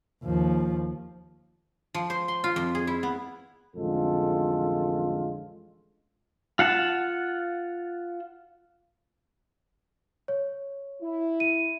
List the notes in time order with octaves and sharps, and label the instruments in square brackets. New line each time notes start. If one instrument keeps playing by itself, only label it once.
[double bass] D#2 F3
[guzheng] F3
C5
C6
F4
F2
G#4
E4
B3
[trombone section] A1 F2 D3 G#3 F4 A4
[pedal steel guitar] F4 F#5 A5
[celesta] C#5
[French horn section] E4
[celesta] D#7